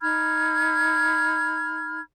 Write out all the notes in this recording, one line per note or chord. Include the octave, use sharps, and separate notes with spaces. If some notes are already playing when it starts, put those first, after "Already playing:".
D#4 B5 F6 G#6